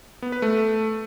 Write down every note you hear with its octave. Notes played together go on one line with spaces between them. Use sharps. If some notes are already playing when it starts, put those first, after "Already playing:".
B3
B4
A3